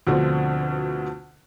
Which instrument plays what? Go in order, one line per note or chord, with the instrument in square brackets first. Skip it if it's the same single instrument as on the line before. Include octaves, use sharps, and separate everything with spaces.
[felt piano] D2 B2 D3 F3 C4